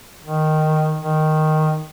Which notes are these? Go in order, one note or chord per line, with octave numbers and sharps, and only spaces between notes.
D#3
D#3